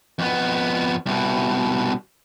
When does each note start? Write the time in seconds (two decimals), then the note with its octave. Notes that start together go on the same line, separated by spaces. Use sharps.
0.19 F2 B3
1.06 C2 B2